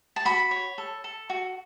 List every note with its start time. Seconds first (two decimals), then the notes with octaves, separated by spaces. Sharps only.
0.16 A5
0.25 F#4 B5
0.51 C#5
0.78 A4
1.04 A4
1.30 F#4